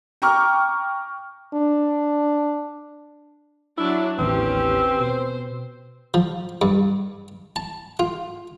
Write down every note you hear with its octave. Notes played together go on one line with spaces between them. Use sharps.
G5 A#5 C#6 D6 F6
D4
F#3 D4 E4 E5
A1 D#2 E3 C4 C#4 G4 B4
B2 C5
F3
G2
A5
F4